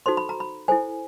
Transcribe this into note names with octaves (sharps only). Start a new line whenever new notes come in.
D#4 F#4 A4 C5 C6
B5
A#5
B5
E4 A4 C5 G#5